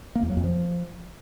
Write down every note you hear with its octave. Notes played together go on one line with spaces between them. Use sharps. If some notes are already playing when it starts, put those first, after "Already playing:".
A#3
E2
F#3
F2
F3